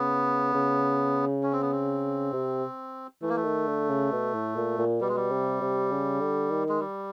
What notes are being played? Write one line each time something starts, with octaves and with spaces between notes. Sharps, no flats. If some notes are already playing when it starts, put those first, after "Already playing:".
Already playing: C#3 B3
C#3
C#4
C4
B3
C4
C3
E3 A3
A#3
A3
D#3
D3
C#3
B2
A2
A#2
A#2
B2 G3
G#3
G3
C3
C3
C#3
D3
D#3
G#3
G3